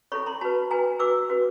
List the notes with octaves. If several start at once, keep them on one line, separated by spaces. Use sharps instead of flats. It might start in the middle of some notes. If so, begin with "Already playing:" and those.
E4 A4 C#5 B5 C#6
A#5 C6
F#4 B4 A5 B5
F#4 B4 G#5 A#5
F#4 B4 D6 E6
F#4 B4